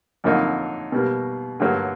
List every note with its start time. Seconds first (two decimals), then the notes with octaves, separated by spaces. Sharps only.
0.24 F2 D3 F#3 A#3 D#4
0.92 B2 G3 A#3
1.60 G2 D3 F#3 A#3